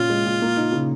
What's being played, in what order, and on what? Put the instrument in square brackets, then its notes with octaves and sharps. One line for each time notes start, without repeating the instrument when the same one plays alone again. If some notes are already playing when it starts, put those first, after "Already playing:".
Already playing: [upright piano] A#2 C#4 [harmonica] F4
[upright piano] G#3
A#2
A#3
D#4
C#3